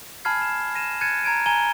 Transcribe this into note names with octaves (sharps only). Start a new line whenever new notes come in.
G#5 A5 B5 F6 G#6 C7
G#6 E7
A#6 D#7 E7
F#6 G#6 A6 C#7 D#7 E7
A#5 G#6 D7 D#7
G#5 A#5 G#6 D#7 G7